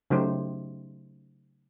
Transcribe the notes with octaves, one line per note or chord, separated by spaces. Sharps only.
C#3 F#3 A3 D#4 G4 C5